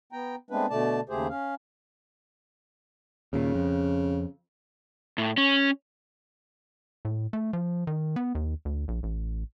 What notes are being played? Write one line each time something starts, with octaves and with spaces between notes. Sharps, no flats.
B3 G5 A#5
G#3 A3 B3 C4 D4 B4
B2 D3 A3 D5 A5
D#2 C#3 A3 G4 G#4 C5
C#4 F5
D#2 A#2 C#3
F2
A2
C#4
A2
A3
F3
D#3
B3
D#2
D2
A#1
A1